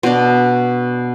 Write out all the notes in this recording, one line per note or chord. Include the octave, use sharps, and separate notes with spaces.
B2 D4